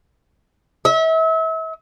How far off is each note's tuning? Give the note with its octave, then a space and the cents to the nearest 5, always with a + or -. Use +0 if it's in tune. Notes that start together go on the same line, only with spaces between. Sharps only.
E5 -35